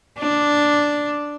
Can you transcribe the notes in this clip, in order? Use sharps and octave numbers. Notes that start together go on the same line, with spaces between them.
D4